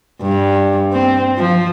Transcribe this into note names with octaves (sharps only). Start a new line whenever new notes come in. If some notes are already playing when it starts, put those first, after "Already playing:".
G2
C4
F3